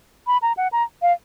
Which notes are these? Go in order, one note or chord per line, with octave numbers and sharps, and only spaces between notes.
B5
A#5
F#5
A#5
F5